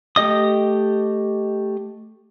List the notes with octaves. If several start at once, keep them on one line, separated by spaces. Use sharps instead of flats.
A3 G4 D#5 D#6